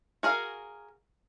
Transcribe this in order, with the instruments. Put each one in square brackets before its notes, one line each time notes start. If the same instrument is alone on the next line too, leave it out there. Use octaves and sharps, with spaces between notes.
[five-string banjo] F#4 G#4 A#4 F5